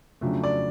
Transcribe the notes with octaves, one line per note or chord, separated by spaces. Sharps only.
F2 C#3 F#3 A3 D4
D5